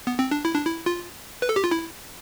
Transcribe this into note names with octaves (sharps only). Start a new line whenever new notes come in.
B3
C4
D4
E4
D4
E4
F4
B4
A4
G4
F4
E4